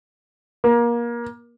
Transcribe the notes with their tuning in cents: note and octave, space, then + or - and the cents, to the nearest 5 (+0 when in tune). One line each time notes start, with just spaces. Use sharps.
A#3 +25